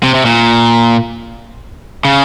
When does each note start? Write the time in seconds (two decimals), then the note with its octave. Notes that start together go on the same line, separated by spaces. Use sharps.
0.03 C3
0.15 C3
0.25 A#2
2.05 C#3